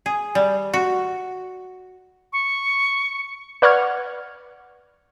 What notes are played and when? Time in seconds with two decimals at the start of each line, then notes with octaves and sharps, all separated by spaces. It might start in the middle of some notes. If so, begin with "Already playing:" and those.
0.06 G#4
0.35 G3
0.74 F#4
2.33 C#6
3.62 B4 D5 F#5 C#6 F6 G#6